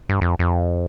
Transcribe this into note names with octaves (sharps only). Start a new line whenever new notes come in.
G2
F2
F2